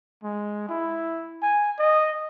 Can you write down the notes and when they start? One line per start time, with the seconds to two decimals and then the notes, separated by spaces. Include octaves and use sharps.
0.24 G#3
0.69 E4
1.42 G#5
1.79 D#5